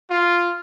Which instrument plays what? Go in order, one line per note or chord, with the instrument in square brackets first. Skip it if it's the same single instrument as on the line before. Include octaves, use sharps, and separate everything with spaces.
[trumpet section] F4